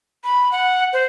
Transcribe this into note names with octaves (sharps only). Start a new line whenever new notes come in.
B5
F#5
C5